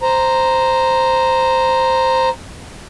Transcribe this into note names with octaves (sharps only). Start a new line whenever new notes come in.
C5 A#5